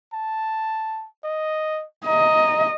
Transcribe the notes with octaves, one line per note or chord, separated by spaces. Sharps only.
A5
D#5
D#5 A#5